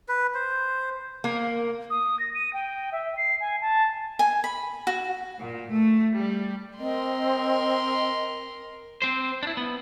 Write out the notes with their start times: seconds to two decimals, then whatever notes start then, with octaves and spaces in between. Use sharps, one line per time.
0.08 B4
0.34 C5
1.24 A#3
1.90 D#6
2.20 A#6
2.34 D#7
2.53 G5
2.92 E5
3.17 C7
3.40 G#5
3.61 A5
4.19 G#5
4.44 B5
4.87 F#4
5.39 A#2
5.71 A3
6.15 G3
6.79 C4 A#4 D#5 C6
9.02 C4 C5
9.43 D4 E4
9.57 B3